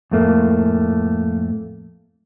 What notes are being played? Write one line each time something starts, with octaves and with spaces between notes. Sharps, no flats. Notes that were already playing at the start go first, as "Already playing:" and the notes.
F2 A2 A3 A#3